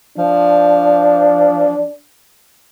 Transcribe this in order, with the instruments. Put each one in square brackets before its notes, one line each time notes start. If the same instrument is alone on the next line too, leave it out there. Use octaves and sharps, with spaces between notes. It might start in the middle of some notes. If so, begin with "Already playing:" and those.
[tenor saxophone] F3 [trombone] D4